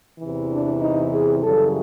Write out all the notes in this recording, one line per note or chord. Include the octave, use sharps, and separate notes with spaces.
E2 C3 E3
D4
D#4
G#4
F#2 C#3 E3 G3 A4